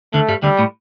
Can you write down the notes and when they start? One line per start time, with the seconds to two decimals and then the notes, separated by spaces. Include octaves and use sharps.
0.13 D2 D3 A3
0.28 G2 G3
0.43 D2 D3 G3
0.59 A2